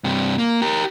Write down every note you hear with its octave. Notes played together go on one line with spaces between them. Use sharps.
G2 C3
A#3
G4 A#4